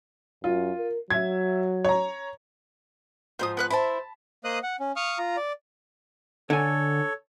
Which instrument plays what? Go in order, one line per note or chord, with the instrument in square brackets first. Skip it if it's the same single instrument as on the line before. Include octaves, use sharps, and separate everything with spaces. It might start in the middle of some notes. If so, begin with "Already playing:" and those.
[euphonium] F#2 [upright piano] F4
[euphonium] A#4
[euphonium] F#3 [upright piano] E5 G#6
[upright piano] C#5 A#5
[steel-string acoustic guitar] G#2 F3 [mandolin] C5 D#6
[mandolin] B3 B4 F#6
[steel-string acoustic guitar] E4 C5 E5 [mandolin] A5 B5
[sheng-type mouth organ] A#3 C5 D#5 D#6 F#6
F#5
C#4
F5 C#6 D#6 F6
F4 A#5
D5
[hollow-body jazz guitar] D3 G#5 [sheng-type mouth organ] A4 C#5